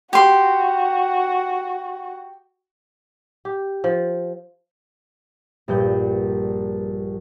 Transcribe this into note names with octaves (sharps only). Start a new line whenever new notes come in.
F#4 G4 C6
G4
F3
A#1 G2 G6